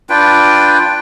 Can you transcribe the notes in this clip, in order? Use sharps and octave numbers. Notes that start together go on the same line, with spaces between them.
D4 F4 B4 G5